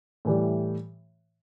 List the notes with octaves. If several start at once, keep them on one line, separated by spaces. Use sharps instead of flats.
A2 E3 G3